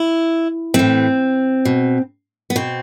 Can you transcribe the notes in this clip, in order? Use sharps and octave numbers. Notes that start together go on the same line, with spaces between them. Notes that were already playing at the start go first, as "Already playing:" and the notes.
Already playing: E4
A2 E3 C4
B2
B3
B2 C4